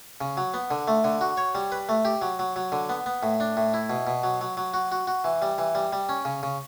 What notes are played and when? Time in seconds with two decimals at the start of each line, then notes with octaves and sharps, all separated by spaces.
0.21 C#3
0.37 F#3
0.54 B3
0.71 D3
0.88 A3
1.04 D3
1.21 F#4
1.37 C#5
1.55 G3
1.72 B4
1.89 A3
2.05 G4
2.22 F#3
2.39 F#3
2.56 F#3
2.72 D3
2.89 B3
3.06 B3
3.23 A2
3.40 D4
3.57 A2
3.74 E4
3.90 B2
4.07 B2
4.23 F#3
4.41 F#3
4.57 F#3
4.74 F#4
4.92 F#4
5.07 F#4
5.24 E3
5.42 G3
5.58 E3
5.75 G3
5.93 G3
6.09 C#4
6.25 C#3
6.43 C#3